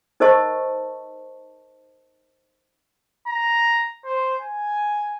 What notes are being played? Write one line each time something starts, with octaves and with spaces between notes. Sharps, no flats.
D#4 A#4 C5 D#5 A5 C#6
A#5
C5
G#5